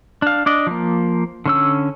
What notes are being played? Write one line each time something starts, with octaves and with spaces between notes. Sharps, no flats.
D4 F5
D4 D5 D#5
F3 A#3
D3 C#4 E6